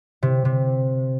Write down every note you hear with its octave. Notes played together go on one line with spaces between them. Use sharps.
C3
C3